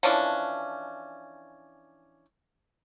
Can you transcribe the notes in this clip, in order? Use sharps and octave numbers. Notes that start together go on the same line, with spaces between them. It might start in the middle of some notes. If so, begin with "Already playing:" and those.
E3 F3 C#4 D4